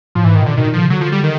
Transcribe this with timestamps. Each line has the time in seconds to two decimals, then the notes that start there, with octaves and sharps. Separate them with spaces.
0.15 A2 F3
0.24 G#2 E3
0.35 D#3
0.41 A#2 D3
0.57 B2 D#3
0.66 A#2
0.74 D3 F3
0.82 C#3
0.90 D3 F#3
1.01 F3
1.12 G3
1.23 D#3